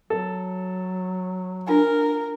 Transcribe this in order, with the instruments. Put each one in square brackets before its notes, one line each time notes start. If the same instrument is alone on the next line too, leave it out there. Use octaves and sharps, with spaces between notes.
[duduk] F#3 [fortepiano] A4
[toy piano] D4 F4 G#5 [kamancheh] A#4